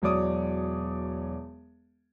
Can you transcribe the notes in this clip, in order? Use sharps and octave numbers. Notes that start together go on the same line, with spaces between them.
E1 F#3 C#5 D5 D6 D#6